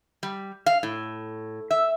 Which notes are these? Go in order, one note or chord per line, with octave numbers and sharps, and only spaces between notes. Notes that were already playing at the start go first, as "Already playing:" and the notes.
G3
F5
A2
E5